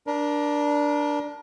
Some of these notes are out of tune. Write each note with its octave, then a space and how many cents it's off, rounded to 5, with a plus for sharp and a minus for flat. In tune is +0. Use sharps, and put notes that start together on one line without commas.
D4 +0 A#4 +30